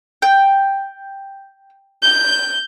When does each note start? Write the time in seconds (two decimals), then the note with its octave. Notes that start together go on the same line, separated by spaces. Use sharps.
0.22 G5
2.03 G6